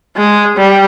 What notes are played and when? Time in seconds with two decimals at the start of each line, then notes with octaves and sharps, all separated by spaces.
0.17 G#3
0.57 G3